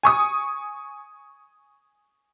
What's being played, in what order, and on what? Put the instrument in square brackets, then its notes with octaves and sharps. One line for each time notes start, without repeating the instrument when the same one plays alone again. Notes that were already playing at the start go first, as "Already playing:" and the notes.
[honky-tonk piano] G#5 C#6 D#6